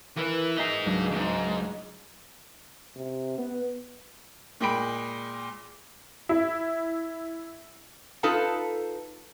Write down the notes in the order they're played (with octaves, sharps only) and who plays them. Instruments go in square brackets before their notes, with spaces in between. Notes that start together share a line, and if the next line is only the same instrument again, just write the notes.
[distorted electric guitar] E3 [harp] A#4 B4
[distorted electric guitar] D#4 G#4 [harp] B6
[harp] C#2 F#3 D4
[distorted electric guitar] F2 G#2
[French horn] C3
B3
[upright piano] A#2 G#3 G5 B5 D7
[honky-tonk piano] E4
[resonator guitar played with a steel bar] D#4 F4 A4 B4 A5